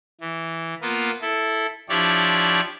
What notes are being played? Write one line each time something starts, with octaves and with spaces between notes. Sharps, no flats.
E3
A#3 B3 F4
E4 A4
F3 D4 E4 G4 C#5 D5